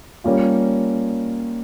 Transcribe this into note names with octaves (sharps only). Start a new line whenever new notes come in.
G3 A#3 C#4 F4